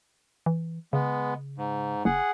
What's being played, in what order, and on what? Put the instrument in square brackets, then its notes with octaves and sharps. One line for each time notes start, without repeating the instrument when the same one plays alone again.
[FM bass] E3
[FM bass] C#3 [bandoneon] G#3 B3
[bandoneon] G#2
[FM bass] F#1 [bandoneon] G#4 F#5